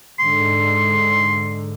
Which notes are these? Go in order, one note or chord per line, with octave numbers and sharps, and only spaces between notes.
G#2 D3 C6